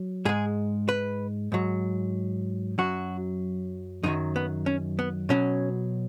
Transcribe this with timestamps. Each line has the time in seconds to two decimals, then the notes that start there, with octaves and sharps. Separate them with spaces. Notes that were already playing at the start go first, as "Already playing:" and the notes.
Already playing: F#3
0.25 G#2 G#3 G#4
0.89 B4
1.52 G#2 F#3
2.78 F#2 F#3 F#4
4.03 F#2 D#3 F#3 D#4
4.36 B3
4.66 C#4
4.99 B3
5.29 B2 F#3 C#4